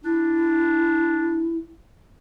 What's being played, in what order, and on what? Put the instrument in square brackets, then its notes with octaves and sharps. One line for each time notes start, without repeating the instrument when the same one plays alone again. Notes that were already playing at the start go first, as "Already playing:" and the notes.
[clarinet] D4 [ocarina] E4